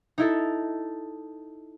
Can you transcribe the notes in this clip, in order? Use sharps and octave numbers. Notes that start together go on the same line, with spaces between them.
D#4 E4 A4